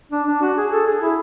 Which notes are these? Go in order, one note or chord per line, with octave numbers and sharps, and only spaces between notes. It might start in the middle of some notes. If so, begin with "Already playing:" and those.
D4
D4
F#4
G#4
A4
G#4
E4